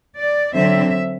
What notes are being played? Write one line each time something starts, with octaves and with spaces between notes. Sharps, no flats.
D5
D3 F#3 C4 E5